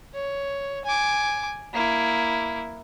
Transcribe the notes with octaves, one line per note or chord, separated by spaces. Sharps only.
C#5
G#5 D6
A#3 E4